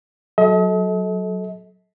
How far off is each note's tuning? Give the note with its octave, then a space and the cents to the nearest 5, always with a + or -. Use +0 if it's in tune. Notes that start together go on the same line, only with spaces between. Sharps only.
F#3 +0 A4 -25 D#5 +45